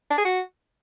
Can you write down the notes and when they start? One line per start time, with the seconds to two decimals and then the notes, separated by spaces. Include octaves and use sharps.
0.10 D4
0.17 G#4
0.25 F#4